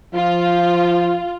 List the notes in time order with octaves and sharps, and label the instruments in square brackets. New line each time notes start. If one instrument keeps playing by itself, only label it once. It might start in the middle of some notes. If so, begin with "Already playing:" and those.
[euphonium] F3 [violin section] F4